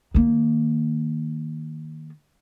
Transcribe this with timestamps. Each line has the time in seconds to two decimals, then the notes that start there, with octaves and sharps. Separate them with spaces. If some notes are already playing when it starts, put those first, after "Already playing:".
0.14 D#3 A#3